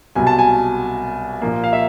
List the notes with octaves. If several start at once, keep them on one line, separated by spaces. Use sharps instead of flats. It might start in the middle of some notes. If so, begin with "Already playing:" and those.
C2 B2 F#3 G#5
A5
G#5
A#2 F3 A#3
F5
E5